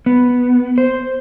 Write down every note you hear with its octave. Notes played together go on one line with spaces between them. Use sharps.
B3
C5